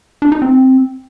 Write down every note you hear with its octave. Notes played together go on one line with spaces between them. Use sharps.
D4
D#4
C4